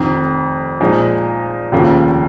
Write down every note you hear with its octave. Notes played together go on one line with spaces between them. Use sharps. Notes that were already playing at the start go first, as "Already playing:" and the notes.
Already playing: F1 F2 D#3
A#2 F3 G#3 D#4
F1 D#2 C#3 F3 A#3